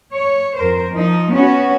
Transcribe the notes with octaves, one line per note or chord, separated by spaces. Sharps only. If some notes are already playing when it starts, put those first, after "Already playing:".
C#5
F2 A#4 C5
F3 D#4
B3 C#4 F#4